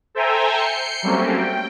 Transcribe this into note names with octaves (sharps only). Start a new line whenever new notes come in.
A4 C5 E5 G5 G#5 A#5
G6 C7 C#7
F#3 G3 A3 A#3 C4 C#4
G5